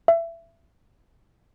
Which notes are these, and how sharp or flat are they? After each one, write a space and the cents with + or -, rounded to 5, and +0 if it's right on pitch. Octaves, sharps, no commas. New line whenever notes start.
E5 +25